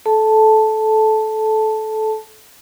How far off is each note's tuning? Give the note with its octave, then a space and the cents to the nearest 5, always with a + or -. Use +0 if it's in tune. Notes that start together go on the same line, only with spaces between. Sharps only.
A4 -20 A5 +0